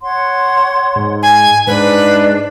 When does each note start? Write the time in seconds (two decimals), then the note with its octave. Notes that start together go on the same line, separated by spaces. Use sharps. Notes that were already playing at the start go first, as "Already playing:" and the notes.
0.01 C#5 F#5 C6
0.96 G#2
1.23 G#5
1.67 G#2 D4 B4